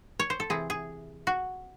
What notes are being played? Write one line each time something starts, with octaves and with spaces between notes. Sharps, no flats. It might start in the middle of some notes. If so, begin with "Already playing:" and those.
C#5
C5
A4
C3 E3 C4 G#4
G#4
F#4